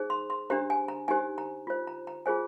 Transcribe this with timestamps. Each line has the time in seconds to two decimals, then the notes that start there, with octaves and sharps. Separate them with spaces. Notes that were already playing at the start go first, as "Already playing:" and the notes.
Already playing: D#4 G#4 C5
0.10 C6
0.30 C6
0.50 D4 G4 C5 A#5
0.70 G#5
0.88 A#5
1.08 D#4 G4 C5 G#5
1.38 A#5
1.67 F4 C5
1.87 A#5
2.07 A#5
2.26 F4 G#4 C5 G#5